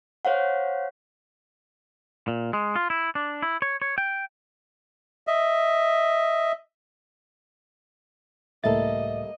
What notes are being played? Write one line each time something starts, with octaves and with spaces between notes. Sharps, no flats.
C5 C#5 F5 F#5
A#2
G#3
F4
E4
D4
E4
C#5
C#5
G5
D#5 E5
C#2 A2 G3 A#3 A4 D#5 E5 A6